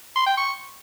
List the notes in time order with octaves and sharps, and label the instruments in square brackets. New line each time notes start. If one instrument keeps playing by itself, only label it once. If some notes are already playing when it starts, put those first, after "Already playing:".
[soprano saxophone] C6
G5
C#6